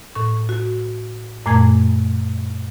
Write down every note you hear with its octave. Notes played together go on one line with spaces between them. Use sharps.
A2 C#6
F#4
F#2 A#2 A3 G#5 G#6